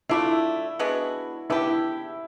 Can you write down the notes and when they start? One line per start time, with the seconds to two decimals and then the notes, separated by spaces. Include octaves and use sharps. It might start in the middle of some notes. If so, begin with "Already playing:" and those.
0.09 A3 D4 E4 F4
0.79 G#3 B3 D4 F#4
1.50 B3 D4 E4 G4